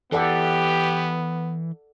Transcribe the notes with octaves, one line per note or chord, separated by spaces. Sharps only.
E3 B3 G4 A4 D5 F#5